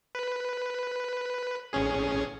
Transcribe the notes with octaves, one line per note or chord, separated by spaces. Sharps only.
B4
A1 C#4 G#4